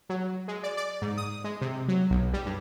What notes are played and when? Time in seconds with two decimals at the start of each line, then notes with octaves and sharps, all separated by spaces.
0.09 F#3
0.48 G#3
0.63 D5
0.77 D5
1.02 G#2
1.17 D#6
1.44 G#3
1.61 C3
1.88 F#3
2.10 B1
2.33 G3
2.46 G2